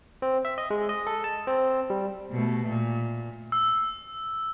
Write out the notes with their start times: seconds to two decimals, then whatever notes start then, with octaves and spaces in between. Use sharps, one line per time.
0.22 C4
0.45 E5
0.58 D#5
0.70 G#3
0.89 D#5
1.07 A4
1.24 A5
1.47 C4
1.90 G3
2.31 B2 A3
2.69 A#2
3.52 E6